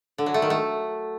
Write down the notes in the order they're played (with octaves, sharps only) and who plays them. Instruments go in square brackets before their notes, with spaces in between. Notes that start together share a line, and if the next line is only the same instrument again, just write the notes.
[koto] D3
F#3
A3
D#3
A3